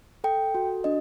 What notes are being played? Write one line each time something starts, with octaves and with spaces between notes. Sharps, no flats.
A4 G5
F#4
D4 D#5